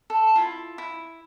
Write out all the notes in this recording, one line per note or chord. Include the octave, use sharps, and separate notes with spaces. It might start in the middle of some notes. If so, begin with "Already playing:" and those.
A4
E4 F4
E4